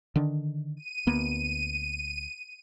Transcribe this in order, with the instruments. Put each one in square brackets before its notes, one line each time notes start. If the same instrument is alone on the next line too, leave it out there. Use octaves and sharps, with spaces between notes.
[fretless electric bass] D3 D#3 D4
[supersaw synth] D#7
[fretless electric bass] D2 A#3 B3